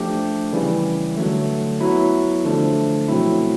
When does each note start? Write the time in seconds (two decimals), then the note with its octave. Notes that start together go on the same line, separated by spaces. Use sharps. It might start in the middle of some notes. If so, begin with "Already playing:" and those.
Already playing: F3 A3 D4 G4
0.53 C#3 E3 G3
1.17 D3 F#3 A3
1.80 F#3 B3 E4
2.44 D3 F3 A3 D4
3.08 B2 F#3 A3 C4 E4